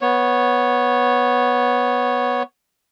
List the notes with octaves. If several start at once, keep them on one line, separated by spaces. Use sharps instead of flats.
B3 C#5